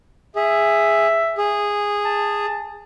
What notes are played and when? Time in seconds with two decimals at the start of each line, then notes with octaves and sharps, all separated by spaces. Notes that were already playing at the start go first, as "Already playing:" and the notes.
0.36 G#4 E5
1.38 G#4
2.05 A5